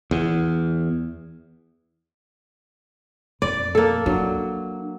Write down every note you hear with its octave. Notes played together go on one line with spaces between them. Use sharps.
E2
F2 D5
A#3 A4
F#3 D4